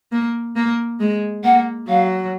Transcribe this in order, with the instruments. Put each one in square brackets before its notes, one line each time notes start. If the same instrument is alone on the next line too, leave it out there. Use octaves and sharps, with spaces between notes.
[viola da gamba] A#3
A#3
G#3
[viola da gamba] A#3 [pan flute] F#5
[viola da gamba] F#3 [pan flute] F5